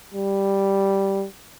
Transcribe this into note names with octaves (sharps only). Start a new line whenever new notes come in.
G3